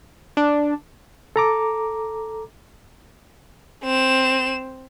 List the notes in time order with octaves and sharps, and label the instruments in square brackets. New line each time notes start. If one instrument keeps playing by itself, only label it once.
[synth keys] D4
[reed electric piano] A4 A#5 D6
[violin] C4 E7